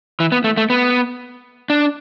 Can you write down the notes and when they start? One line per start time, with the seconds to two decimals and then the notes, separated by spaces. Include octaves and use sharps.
0.20 E3
0.32 B3
0.44 A3
0.57 A3
0.70 B3
1.70 D4